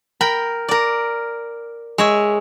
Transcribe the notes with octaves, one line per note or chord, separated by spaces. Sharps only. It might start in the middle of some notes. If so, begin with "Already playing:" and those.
A#4 G5 B5
A#4 D5
G#3 C#5 E5